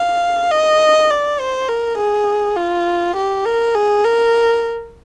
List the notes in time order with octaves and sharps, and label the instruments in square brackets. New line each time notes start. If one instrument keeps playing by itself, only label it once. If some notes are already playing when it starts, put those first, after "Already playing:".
Already playing: [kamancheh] F5
D#5
D5
C5
A#4
G#4
F4
G4
A#4
G#4
A#4